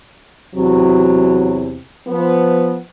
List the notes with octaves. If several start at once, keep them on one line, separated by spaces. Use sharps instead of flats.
E2 C3 F#3
F3 B3